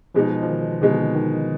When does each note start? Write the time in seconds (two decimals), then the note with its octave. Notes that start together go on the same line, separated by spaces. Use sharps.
0.15 B2 F3 G#3 D#4
0.43 F3
0.48 D#3
0.81 B2 D3 G#3 D#4
1.15 D#3